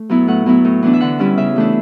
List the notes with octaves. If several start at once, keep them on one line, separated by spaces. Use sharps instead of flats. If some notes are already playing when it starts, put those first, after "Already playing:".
Already playing: A3
F#3 B3 E4
A2 F#5
F#3 B3 E4
A2
E3 B3 D4
E5
D3 F#5
G3 C#4 E4
C#3 E5
E3 A3 D4